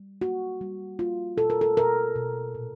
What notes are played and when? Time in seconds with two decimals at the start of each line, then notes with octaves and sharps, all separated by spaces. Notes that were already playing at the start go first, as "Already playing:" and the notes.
Already playing: G3
0.21 A#3 F#4
0.61 G3
0.99 A#3 F4
1.38 B2 A4
1.50 A#4
1.61 A4
1.77 B2 A#4
2.16 B2
2.55 A#2